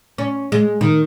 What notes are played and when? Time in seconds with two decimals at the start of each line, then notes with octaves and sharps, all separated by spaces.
0.18 C#4
0.52 G#3
0.81 D#3